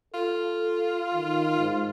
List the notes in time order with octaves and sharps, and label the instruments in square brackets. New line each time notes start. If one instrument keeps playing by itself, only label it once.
[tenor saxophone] F4 [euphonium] A4
[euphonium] D#3
G#2